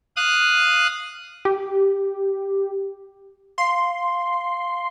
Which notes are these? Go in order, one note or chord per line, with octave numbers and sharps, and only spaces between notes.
F5 D#6 F#6
G4
F5 C6